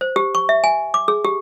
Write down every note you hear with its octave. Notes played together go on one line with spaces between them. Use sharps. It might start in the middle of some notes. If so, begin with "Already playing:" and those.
C5
G4
C#6
E5
G#5
D6
G#4
G4